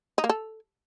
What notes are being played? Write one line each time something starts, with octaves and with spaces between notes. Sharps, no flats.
D#4
A#3
A4